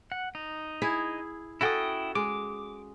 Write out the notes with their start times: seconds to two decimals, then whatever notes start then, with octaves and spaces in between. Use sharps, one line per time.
0.12 F#5
0.35 D#4
0.82 E4 G#4 E5
1.61 C#4 E4 F#4 A4 G5 D#6
2.15 G#3 D6